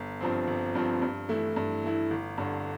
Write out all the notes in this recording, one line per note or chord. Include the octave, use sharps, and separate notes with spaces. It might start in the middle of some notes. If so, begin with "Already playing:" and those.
Already playing: G1
G2 F3 C4
G1
G2 F3 C4
G2
E3 A3 E4
G2
E3 A3 E4
G1
G2 D3